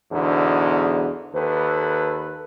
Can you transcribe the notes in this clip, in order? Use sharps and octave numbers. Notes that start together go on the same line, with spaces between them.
E2 G#2 B2 D3
D#2 A4 B4